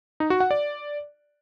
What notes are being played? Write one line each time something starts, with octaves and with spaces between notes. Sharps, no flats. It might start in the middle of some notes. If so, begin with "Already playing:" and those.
D#4
F#4
F#5
D5